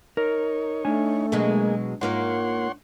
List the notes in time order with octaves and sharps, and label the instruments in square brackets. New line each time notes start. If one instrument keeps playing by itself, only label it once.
[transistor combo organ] D#4 C#5 [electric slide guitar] A#4
[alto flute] A3 [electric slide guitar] D4 G#5
[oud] B2 F#3 G#3 [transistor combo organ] A#3 G#4
[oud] G#2 A#3 A#4 [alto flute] F4 [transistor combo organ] C#5 F#5 C6